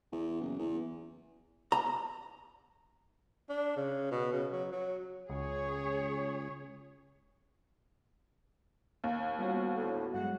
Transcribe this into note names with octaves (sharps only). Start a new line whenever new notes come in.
E2
F#1
E2
A#5
D4
C#3
B2
C#3
F#3
F#3
C#2 G#4 C#5
D#2
F3 G3 B3 C#4 F#4
D2 A2
G2 F#3 G#3 F#4 F#5